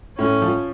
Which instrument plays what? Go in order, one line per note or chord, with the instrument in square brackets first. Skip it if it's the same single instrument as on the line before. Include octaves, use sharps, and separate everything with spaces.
[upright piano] A2 [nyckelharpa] C#4
[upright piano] F3